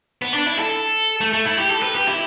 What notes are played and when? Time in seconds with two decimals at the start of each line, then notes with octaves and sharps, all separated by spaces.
0.22 B3
0.34 D4
0.46 E4
0.59 A4
1.21 A3
1.33 A3
1.46 E4
1.58 G4
1.70 A4
1.82 B4
1.95 G4
2.08 E4